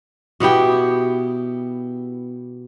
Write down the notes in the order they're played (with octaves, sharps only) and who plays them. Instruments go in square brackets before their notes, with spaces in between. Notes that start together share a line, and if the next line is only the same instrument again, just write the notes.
[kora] B2 B3 E4 G4